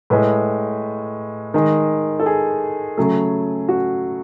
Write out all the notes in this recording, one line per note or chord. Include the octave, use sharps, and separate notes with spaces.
A2 G#3 B4
D#3 G#3
A4
G#4
C#3 F#3 A3
F#4